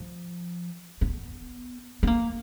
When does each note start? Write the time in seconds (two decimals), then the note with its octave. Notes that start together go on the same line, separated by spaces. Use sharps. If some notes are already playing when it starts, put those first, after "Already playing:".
Already playing: F3
1.01 B3
2.03 B3
2.07 A#3